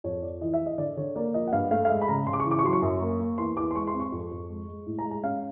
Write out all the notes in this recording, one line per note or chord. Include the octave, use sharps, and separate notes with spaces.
F2 C#5
F3 D5
E3 D#5
E5
E3
D#5
D3 D5
D3 C#5
A#3 D5
F3 D#5
F#5
G2 F5
A3 F5
F5
G#3 E5
B5
C#3 A#5
C#3 C6
D6
C#6
E3
D6
C#6
F#3 C6
C#6
F#2
A#3
A#3
E2 C6
E2 D6
C6
G#3 C#6
C6
C4
C#6
F2
F2
G#3
G#3
A2
A#5
G#3
A#5
C#4 F5